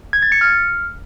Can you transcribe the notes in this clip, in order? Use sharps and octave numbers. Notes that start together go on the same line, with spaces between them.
G#6
A6
C#7
F6